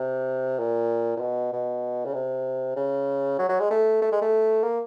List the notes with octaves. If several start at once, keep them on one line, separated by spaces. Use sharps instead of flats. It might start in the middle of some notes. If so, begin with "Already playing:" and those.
Already playing: C3
A#2
A#2
B2
B2
C#3
C3
C#3
F#3
F#3
G#3
A3
A3
G#3
A3
A#3